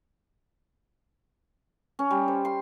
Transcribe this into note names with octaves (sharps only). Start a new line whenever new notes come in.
C#4
G3
C5
C6